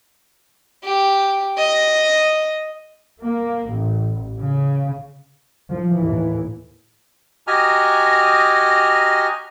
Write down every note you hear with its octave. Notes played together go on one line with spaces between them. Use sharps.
G4
D#5
A#3
A1
C#3
F3
D#2 A2 E3
F#4 G4 D#5 G#5 A#5 F6